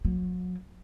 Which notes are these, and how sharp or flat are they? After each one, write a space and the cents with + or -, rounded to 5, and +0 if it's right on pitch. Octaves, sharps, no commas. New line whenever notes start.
F#3 -35